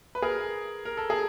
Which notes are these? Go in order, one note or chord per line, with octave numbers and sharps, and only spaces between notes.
B4
G#4 A#4
A#4
A4
G#4